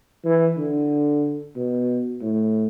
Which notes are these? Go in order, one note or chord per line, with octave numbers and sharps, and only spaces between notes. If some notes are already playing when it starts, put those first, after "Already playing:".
E3
D3
B2
A2